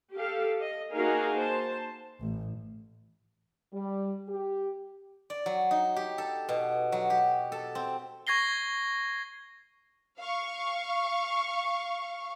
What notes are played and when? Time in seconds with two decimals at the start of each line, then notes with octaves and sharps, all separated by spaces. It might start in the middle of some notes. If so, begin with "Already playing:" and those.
0.13 G4 A4 F5
0.60 D#5
0.93 A#3 D#4 F#4 G#4 A#4 F5
1.39 C5 A5
2.20 A1
3.73 G3
4.29 G4
5.30 D5
5.46 F#3
5.71 D#4
5.96 G4
6.18 A4
6.49 B2
6.92 F#3
7.10 G4
7.52 A4
7.75 C4
8.27 C#6 G#6 A#6 C7 G7
10.19 F5 C#6